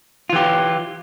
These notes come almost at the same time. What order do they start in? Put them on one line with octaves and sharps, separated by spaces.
F4 E3 G4